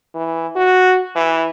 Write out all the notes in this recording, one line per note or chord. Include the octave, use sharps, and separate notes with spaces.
E3
F#4
E3